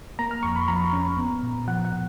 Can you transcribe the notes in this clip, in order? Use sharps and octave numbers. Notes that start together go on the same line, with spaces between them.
A#3 A#5
F6
F2 C#6
B5
F3 A#5
C#4
B3
A#2
F3 F#5
F#5
A#2